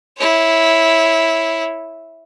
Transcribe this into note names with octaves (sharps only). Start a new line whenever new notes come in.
E4 C#5